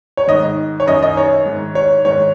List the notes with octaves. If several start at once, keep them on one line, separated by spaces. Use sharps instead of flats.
C#5
G#2 D#3 D#5
C#5
F#2 D#3 D#5
D#5
C#5
G#2 D#3
C#5
G#2 D#3 C#5